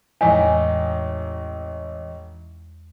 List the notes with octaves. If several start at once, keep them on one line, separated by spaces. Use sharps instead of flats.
A1 E2 G#3 D#4